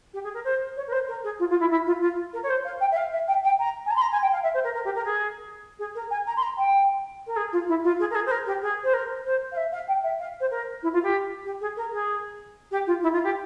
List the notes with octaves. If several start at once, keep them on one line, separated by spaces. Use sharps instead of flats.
G4
G#4
A#4
C5
C#5
A#4
C5
A#4
G#4
F4
F4
E4
E4
F4
F4
A#4
C#5
C5
F5
G5
E5
F5
E5
G5
G5
A#5
G#5
A#5
C6
A#5
G#5
G5
F5
E5
C5
A#4
A#4
G4
A#4
G#4
G#4
A#4
G#5
A#5
C6
A#5
G5
A#4
G#4
F4
E4
F4
G#4
A#4
G#4
C5
A#4
G4
G#4
C5
A#4
C5
F5
E5
F5
G5
E5
F5
C5
A#4
E4
F4
G4
G4
G#4
A#4
G#4
G4
F4
E4
F4
G4